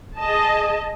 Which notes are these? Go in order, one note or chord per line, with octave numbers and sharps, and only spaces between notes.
G#4 D#5 A5